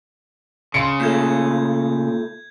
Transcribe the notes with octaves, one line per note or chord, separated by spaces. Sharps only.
C#3 C6 C#7
A#2 A3 G6 G#6